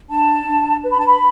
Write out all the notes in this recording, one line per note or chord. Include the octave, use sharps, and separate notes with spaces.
D4 A5
D4
B4
B5
A5
B5